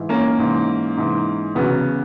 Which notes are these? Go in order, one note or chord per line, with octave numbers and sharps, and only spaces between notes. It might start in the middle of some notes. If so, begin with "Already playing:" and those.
Already playing: G#2 E3
A#3 C#4
G#2 E3
G#2 E3
E2 C#3 F#3 B3